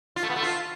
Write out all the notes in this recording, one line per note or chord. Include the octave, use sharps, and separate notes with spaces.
F4
A3
B3
A3
F4